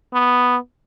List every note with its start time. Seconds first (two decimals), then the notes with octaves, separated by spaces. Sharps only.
0.13 B3